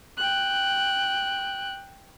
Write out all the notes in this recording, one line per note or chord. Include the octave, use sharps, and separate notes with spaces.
G5 F#6